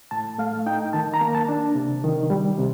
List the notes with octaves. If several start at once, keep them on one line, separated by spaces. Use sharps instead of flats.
A2 A5
A3 F5
D#4 G5
D#3 A5
A#5
A#3
A5
D4
C3
D#3
G3
C3